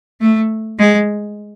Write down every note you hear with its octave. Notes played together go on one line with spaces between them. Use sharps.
A3
G#3